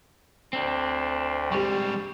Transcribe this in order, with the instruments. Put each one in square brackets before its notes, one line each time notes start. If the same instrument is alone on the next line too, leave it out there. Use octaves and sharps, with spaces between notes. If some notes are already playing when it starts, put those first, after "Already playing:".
[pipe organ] D2 [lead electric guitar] C4 D4
[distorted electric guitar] G#2 G3 [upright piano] G4 C#6